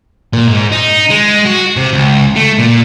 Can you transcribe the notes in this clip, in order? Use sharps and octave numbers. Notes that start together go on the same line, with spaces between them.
A#2
G#2
D#4
G#3
F#4
C3
C#2
A3
A#2